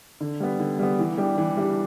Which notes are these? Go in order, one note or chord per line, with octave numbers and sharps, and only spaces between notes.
D3
G3 B3
D3
G3 B3
E3
G3 D4 G4
E3
G3 D4 G4